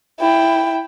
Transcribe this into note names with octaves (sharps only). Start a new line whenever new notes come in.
E4 G5